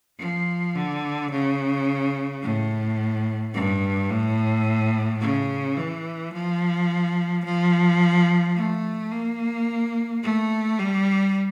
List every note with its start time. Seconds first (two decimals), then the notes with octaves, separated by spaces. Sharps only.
0.19 F3
0.75 D3
1.31 C#3
2.42 A2
3.54 G2
4.10 A2
5.21 C#3
5.77 E3
6.32 F3
7.45 F3
8.55 A3
9.11 A#3
10.23 A3
10.79 G3